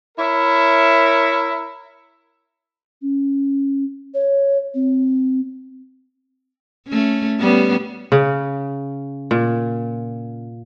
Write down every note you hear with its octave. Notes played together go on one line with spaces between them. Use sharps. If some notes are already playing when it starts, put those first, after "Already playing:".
E4 A#4 C#5 E5
C#4
C#5
C4
A3 C#4
G3 B3 C#4
C#3
A#2